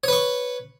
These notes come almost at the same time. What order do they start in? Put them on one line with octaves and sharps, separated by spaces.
C#5 B4 C#6